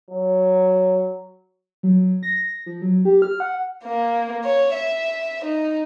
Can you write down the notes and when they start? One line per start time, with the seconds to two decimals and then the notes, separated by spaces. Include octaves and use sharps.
0.10 F#3
1.83 F#3
2.23 A#6
2.66 F3
2.82 F#3
3.05 G4
3.22 F6
3.40 F#5
3.84 A#3
4.44 C#5
4.74 E5
5.45 D#4